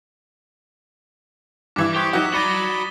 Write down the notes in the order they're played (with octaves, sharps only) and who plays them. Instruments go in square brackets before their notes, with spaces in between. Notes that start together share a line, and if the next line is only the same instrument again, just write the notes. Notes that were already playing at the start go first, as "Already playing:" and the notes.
[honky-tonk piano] G2 E3 E4 [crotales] D6
[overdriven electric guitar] G4 [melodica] C5 C#6 [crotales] D#6
[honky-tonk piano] F#3 D#4 F#4 [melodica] E5 [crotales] B6 E7
[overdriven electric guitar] F#4 A#5 [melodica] D5 B5 [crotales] A6 D#7 G7 [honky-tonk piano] B6